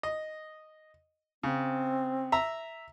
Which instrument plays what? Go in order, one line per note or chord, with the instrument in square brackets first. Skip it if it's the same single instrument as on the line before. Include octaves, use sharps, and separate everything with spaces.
[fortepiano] D#5
[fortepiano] C#3 [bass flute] C4
[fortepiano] E5 A#5